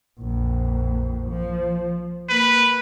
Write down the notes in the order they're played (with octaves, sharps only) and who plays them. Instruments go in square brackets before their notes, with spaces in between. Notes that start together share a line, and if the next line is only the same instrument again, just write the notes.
[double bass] A#1 F2
F3
[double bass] A#3 [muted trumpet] B4